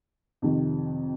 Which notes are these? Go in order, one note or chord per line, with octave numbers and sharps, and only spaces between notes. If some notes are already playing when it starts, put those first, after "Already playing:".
F2 C3 D#3